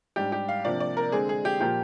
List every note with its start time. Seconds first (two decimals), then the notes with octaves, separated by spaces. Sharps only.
0.16 G#2 G3 D4 G4
0.32 G4
0.49 F5
0.64 C3 F3 A#3 D4 D5
0.80 D5
0.97 A#4
1.12 D3 G#3 C4 G#4
1.29 G#4
1.45 G4
1.60 A#2 F3 A#3 G4